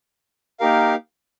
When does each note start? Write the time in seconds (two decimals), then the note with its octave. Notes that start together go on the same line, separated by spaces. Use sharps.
0.60 A#3 D#4 G4 A#4 F5